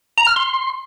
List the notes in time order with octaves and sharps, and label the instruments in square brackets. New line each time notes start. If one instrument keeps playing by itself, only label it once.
[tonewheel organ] A#5
F6
C6